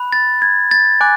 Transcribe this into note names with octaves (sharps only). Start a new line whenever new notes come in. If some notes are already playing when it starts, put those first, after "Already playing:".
Already playing: B5 F#6
A6
G#6
A6
G#5 D6 F#6